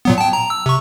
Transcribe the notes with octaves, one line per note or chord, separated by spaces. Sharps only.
A#2 F#3 B3
G5 A5
A#5
E6
C3 C#6